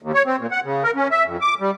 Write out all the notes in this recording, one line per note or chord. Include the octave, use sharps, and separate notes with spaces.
D#2
C#5
C4
A#2
F#5
C#3
A#4
C#4
E5
F2
D6
G3